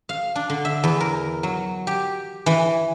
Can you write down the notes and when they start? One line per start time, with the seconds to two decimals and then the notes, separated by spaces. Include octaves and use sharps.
0.09 F5
0.36 D4
0.50 D3
0.65 E5
0.84 E2
1.00 A#4
1.43 F#3
1.87 G4
2.46 E3